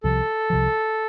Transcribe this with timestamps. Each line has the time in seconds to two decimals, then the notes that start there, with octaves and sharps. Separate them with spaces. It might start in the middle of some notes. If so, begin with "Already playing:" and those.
0.03 C2 C3 F3 A4
0.50 C2 C3 F3